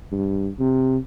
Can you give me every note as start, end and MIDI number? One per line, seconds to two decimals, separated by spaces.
0.12 0.48 43
0.59 0.97 48